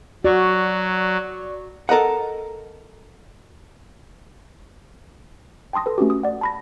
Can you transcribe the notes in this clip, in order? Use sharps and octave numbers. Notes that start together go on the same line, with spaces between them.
F#3 F#4 D5 C#6
A4 A#4 D#5 F#5
G5 A5 C6 D#6 A#6
A4 B4
A3 C#4 F#4 G4
D#6
D5 F#5
A5 B5 A#6